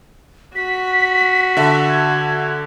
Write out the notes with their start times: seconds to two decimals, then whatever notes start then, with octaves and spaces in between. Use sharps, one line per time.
0.56 F#4 B6
1.57 D3 E5 A5
1.89 G#6